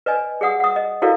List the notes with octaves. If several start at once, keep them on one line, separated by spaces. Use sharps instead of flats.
B4 D5 D#5 G#5
G#4 D5 F#5 D#6
F#5 D#6
D#5
E4 F#4 A4 A#4 D5 F5